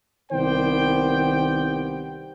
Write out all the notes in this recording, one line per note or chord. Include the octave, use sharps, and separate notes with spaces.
C2 D#3 B3 G4 C5 G5